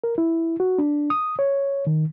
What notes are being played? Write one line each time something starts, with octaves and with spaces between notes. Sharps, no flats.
A#4
E4
F#4
D4
D#6
C#5
D#3